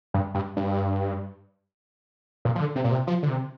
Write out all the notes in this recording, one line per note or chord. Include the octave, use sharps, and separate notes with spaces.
G2
G2
G2
A#2
F3
D3
C3
A#2
C3
F3
D3
C3